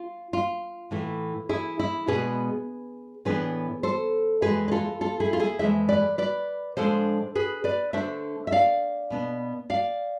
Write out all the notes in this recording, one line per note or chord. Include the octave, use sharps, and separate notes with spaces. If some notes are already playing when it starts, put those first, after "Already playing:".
Already playing: F4
F4
A2 E3 A3
E4 G#4
E4
B2 G#3 B3 D4 G#4 B4
A2 E3 B3 D4 G#4 B4
A4 C5
F2 E3 G#3 G#4 B4
B4
F4 A4
F4 A4
E4 G#4
F4
E4 G#4
F2 E3 G#3 C5 E5
B4 D5
B4 D5
A2 F3 G#3 D4 A4 C5
G#4 B4
B4 D5
D3 A3 D4 C5 E5
E5
D5 F5
B2 B3 D4
D5 F5